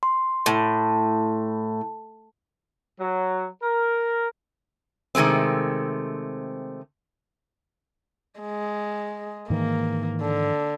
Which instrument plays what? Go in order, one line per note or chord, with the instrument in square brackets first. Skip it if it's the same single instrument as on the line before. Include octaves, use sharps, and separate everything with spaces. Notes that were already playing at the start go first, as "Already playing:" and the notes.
[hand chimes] C6
[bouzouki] A2
[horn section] F#3
A#4
[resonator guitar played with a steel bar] C3 D#3 G#3 A3 C4
[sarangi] G#3
[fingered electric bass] G#2 D#3 E3 [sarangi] A#3
[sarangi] D3